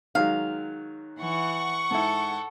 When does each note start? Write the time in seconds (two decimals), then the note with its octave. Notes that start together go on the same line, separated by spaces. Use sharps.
0.15 D#3 F#3 G#3 F5
1.21 E3 F#5 C#6
1.91 G#2 E4 A4